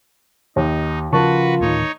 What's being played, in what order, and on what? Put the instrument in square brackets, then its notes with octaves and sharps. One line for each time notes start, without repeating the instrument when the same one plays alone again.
[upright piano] D#2 [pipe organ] D#4
[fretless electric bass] C#3 F3 [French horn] F4 [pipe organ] F#4 B4 [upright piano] A#4 A5 C#6
[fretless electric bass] D1 A2 D#3 [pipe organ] D#4 C#5